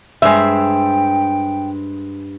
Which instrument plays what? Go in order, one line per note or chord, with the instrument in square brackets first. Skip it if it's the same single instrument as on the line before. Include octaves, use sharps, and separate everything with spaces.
[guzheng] G2 C5 [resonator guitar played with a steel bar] G#3 E5 [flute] G5